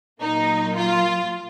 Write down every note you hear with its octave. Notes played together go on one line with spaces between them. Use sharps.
A#2 F#3 A#3 D#4
F4